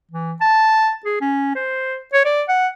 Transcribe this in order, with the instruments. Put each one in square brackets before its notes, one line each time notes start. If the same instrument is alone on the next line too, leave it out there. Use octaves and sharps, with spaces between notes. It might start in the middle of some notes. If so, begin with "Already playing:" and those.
[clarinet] E3
A5
G#4
C#4
C5
C#5
D5
F#5